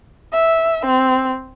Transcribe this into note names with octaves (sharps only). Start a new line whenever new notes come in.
E5
C4